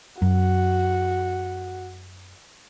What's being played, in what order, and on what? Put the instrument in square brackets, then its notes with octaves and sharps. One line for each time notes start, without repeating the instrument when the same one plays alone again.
[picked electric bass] F#2 [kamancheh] F#4